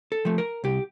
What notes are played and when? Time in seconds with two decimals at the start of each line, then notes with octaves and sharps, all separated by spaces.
0.12 A4
0.25 F3 A3
0.38 A#4
0.64 C2 G4